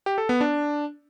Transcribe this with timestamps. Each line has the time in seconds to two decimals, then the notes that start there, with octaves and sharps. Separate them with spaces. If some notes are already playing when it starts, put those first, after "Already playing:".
0.06 G4
0.18 A4
0.29 B3
0.41 D4